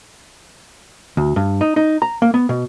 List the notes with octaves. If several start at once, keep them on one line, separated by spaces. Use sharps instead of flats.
D2
G2
D#4
D#4
A#5
A#3
B3
B2